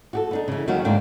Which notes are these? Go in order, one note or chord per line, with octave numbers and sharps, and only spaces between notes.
F#4 G4 A4
B3 D4 D#4
C#3 E3
D#2 D#3 F#3 F#4
D2 G#2 A#3 D4 G5